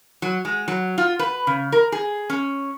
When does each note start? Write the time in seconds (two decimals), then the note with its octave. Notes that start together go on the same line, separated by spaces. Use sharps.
0.22 F#3
0.45 G#3
0.68 F#3
0.98 F4
1.19 B4
1.47 C#3
1.72 A#4
1.92 G#4
2.30 C#4